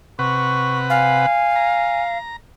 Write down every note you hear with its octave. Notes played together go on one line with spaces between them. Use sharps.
C3 B4 F#5 C#6
F5 G#5
A#5